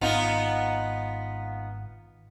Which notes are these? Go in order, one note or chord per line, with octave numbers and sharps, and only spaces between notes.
G#1 B3 D#4 F4